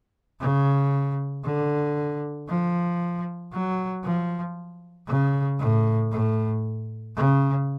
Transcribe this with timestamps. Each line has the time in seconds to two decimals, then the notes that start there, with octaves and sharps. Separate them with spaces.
0.40 C#3
1.44 D3
2.48 F3
3.52 F#3
4.04 F3
5.08 C#3
5.59 A2
6.12 A2
7.16 C#3